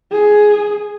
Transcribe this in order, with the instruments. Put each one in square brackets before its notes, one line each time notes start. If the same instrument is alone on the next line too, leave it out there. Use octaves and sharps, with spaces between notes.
[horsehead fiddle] G#4